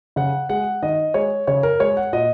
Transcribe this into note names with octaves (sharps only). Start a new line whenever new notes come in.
C#3 F#5
G#3 F#5
D#3 D#5
G#3 C#5
C#3 C#5
A#4
G#3 C#5
F#5
A#2 D#5